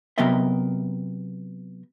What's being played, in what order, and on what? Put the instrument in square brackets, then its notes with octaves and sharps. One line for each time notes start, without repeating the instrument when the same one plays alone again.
[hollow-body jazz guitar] C3 F#3 B3 A#4 D#5 E5